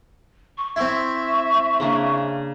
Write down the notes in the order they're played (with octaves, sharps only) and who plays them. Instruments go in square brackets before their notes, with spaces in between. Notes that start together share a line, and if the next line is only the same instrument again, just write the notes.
[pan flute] C#6
[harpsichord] C4 E4 [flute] E5 [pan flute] C#6
[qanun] C#3 A#3 D4